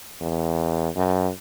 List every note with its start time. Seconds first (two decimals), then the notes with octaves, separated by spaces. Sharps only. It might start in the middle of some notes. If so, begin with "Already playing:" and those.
0.21 E2
0.96 F#2